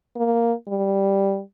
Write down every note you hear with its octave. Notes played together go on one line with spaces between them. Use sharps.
A#3
G3